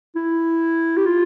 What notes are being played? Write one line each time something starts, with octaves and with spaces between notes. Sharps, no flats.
E4
G4
F4